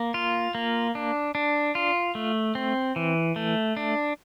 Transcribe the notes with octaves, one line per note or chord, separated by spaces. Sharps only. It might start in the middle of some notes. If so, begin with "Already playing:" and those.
Already playing: A#3
F4
A#3
D4
D4
F4
A3
C4
E3
A3
D4